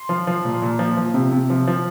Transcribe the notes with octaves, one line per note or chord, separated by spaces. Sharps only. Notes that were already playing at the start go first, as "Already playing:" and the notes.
Already playing: C6
F3
F3
A#2
A#2
F3
F3
C3
C3
F3
F3